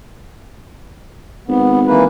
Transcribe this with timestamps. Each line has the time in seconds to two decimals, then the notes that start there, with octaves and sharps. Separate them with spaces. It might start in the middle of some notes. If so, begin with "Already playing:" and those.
1.48 G#1 B3
1.87 E3 A#3 B4